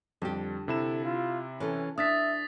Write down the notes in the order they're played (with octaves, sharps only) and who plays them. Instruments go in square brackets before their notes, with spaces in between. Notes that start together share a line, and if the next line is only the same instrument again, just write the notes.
[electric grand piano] F2 G3 [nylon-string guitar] D3 G4
[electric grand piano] C3 E4 E7 [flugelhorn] A4
[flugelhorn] F4
[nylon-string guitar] E3 A4 [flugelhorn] C#4
[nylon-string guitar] D4 [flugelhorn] E5 [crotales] D#6 A6 B6